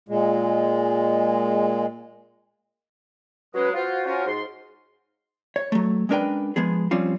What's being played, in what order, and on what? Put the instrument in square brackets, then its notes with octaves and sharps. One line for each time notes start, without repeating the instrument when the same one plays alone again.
[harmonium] A#2 G#3
[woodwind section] F#3 G#3 [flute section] C#4 B4
[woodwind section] F4 [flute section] F#4 C5 F#5
[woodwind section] C#4 F4 A#4
G#2 C6
[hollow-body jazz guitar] C#5
F#3 A3
G#3 C#4 D4 A#4 B4 G5
F3 G#3 B3 G#4
F3 G3 C4 C#4 F4